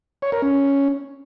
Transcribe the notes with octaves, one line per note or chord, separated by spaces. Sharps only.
C#5
A#4
C#4